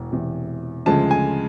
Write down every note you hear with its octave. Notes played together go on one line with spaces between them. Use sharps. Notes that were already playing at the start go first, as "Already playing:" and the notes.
Already playing: E1 E2
E1 E2 C3
D2 C#3 F3 G#3 A5
G#5